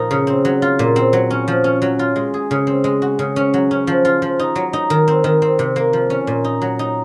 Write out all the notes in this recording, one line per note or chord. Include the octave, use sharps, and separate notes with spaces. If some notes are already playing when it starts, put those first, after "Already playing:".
Already playing: A#2 F3 A#3 D#4
C#3
C4
F#3
F4
A#2
C4
F#3
C#4
F3
C#4
F#3
F4
G#3
G#4
C#3
C4
G#3
F#4
C#3
C#4
F#3
C#4
F3
F4
F3
D#4
F#3
D#4
D#3
C4
D#3
C4
C3
A#3
F3
C#4
A#2
D#4
F#3
D#4